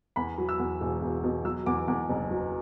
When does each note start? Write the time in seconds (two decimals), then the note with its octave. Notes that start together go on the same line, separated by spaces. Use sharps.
0.16 E2 B5
0.38 F#3
0.49 E6
0.59 E2
0.81 E1
1.02 E1
1.24 B2
1.45 F#3 E6
1.66 E2 D6
1.88 E2 D6
2.09 F#1
2.31 F#3